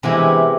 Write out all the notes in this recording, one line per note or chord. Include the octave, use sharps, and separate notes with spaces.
C3 E3 G#3 B3 E4